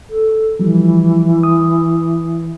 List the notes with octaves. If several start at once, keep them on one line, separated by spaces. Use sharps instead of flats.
A4
E3 F3 G3
D#6